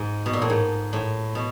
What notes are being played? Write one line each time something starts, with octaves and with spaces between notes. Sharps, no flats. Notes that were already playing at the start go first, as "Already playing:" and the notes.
Already playing: G#2
B2
A#2
A2
G#2
A2
B2